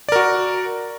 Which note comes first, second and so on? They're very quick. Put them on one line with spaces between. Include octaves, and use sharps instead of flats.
D5 A#4 F#4